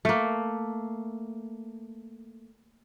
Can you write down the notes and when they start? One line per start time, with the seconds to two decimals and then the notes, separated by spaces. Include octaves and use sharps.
0.05 A3 A#3